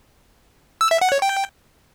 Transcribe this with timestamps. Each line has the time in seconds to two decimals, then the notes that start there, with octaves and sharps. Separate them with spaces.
0.81 E6
0.91 E5
1.01 F#5
1.12 C#5
1.22 G5